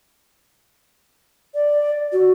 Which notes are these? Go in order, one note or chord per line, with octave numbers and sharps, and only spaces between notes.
D5
F#4